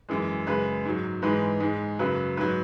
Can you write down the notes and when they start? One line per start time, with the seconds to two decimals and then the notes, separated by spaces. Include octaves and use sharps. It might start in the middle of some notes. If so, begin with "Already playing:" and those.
0.09 F#2 E3 G#3
0.47 F#2 C#3 G#3 B4
0.85 G#2 F#3
1.22 G#2 E3 G#3 B4
1.60 G#2 G#3
1.99 F#2 C#3 F#3 B4
2.37 G#2 F#3 B4